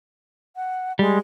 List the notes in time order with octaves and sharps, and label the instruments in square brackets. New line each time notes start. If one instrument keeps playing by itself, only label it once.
[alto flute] F#5
[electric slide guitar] G3 [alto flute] G#3